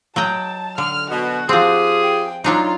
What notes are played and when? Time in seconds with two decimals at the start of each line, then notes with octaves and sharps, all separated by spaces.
0.16 F#3 D#5 G5 A5
0.78 D3 F6
1.11 B2 F#4
1.49 F3 C4 F4 G4 G#4
2.04 G5
2.44 F#3 D4 D#4 F4